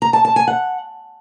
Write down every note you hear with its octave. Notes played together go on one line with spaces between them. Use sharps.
A#5
A5
A5
G#5
F#5